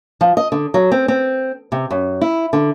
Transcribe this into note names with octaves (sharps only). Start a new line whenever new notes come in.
F3
D#5
D3
F#3
C4
C4
C3
F#2
E4
D3